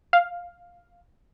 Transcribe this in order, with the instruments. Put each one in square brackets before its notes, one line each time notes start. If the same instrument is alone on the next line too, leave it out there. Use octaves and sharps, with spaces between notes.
[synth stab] F5